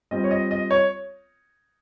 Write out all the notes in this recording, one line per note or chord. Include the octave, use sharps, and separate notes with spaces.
G3 C4 F4 D#5
C#5
D#5
D#5
C#5